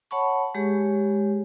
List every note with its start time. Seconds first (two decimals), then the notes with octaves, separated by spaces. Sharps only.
0.11 C#5 F#5 A5 B5 C#6
0.55 G#3 G4 G#4 C#5